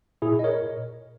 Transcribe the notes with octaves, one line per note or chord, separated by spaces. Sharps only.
A#2 E4 G#4
D#5
A#4 C#5